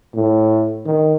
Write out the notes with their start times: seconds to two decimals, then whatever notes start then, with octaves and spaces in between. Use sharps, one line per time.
0.14 A2
0.86 D#3